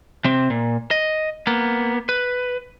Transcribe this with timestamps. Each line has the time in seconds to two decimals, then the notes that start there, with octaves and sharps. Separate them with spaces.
0.25 C3 C4
0.50 A#2
0.91 D#5
1.47 A#3 B3
2.09 B4